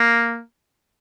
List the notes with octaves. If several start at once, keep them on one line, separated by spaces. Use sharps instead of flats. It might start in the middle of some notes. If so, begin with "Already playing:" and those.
Already playing: A#3